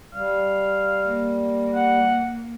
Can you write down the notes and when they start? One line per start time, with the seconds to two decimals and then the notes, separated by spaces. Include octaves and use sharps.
0.15 G3 F5
1.06 A#3
1.75 F#5